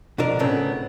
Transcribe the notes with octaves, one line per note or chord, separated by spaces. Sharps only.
B2 D3 F3 D4 A#4
A2 C#3 B3 C4